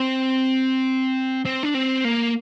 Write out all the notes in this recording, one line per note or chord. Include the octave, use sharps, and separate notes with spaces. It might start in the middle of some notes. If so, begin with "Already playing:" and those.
Already playing: C4
C4
D4
C4
A#3